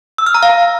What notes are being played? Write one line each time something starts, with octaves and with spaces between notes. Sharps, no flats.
E6
F6
A#5
F5